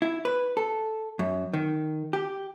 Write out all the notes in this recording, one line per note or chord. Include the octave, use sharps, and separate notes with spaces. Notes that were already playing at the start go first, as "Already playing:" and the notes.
E4
B4
A4
F#2
D#3
G4